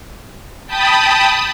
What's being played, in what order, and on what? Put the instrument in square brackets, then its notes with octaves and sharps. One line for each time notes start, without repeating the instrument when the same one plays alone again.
[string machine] G5 A5 B5 D#6